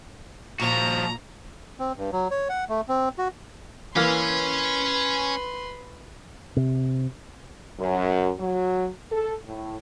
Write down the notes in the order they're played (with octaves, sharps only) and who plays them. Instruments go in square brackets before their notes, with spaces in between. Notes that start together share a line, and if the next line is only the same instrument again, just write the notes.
[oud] A#2 [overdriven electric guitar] F3 F#4 [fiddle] A#5
[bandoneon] C4
G2
F#3
C#5
F#5
A3
C4
F#4
[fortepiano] E3 A#3 F5 [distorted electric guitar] C#4 [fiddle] B4 C6
[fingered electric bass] C3
[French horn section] F#2
F#3
A4
A2